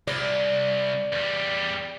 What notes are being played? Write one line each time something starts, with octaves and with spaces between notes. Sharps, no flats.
C2 D5
E2 G3